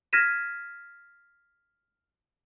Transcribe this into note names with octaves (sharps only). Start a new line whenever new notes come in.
F6 G#6 A#6 B6 D#7 E7